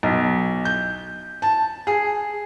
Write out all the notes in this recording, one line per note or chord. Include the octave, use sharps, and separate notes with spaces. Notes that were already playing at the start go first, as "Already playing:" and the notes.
B1
G6
A5
G#4